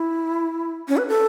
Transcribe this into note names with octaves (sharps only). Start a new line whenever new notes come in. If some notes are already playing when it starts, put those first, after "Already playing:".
Already playing: E4
C#4
B4
A4